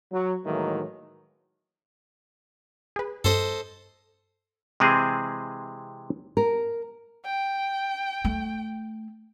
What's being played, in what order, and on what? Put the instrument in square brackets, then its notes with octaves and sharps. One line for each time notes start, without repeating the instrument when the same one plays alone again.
[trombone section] F#3
A2 D#3 E3 F#3 G#3 A#3
[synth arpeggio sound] G#4 B4
[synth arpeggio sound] G2 [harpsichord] A4 C5 D#5
[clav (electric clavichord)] C3 E3 G#3 C4 G#4
[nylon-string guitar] A#4
[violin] G5
[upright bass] A3